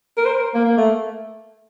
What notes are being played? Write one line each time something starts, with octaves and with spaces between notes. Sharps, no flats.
A#4
C5
A#4
A#3
A#3
A3